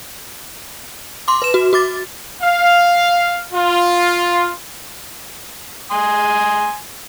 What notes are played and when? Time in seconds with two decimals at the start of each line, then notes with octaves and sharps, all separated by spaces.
1.28 C6 D6
1.42 B4 E7
1.54 F#4
1.73 F#4 D6 A6
2.42 F5
3.53 F4
5.91 G#5 C6 D#6